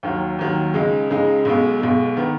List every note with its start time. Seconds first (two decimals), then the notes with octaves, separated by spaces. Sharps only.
0.03 D#2 D#3 F#3
0.39 D#2 D#3 F#3
0.74 C#2 C#3 G#3 D#4
1.10 C#2 C#3 G#3 D#4
1.45 B1 B2 G#3
1.81 B1 B2 G#3
2.17 D#3 B3